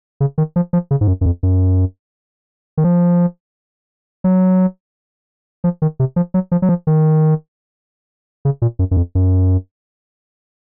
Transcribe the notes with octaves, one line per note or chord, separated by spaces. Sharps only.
C#3
D#3
F3
F3
C#3
G#2
F#2
F#2
F2
F#2
D#3
F3
F#3
F3
D#3
C3
F3
F#3
F3
F#3
F3
D#3
C#3
A#2
F#2
F#2
F2
F#2